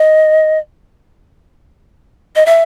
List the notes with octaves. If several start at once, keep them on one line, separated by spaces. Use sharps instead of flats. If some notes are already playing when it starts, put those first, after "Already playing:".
Already playing: D#5
D#5
E5